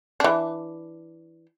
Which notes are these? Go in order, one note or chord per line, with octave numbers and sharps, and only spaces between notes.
E3 D4